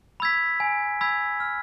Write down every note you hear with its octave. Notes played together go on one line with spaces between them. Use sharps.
B5 E6 G#6 B6
G#5
B5 E6 G#6 B6
F6